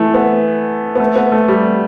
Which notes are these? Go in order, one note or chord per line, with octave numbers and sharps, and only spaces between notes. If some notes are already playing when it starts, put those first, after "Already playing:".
Already playing: E3 A3
B3
B3
A3
B3
A3
G3